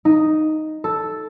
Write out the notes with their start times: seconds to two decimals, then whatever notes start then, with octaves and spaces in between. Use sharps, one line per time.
0.05 D#4
0.84 A4